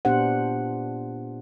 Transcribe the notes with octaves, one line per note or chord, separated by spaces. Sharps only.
A#2 B3 D4 G4 C5 F#5